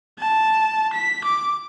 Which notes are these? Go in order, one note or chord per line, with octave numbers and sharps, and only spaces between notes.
A5
B6
D6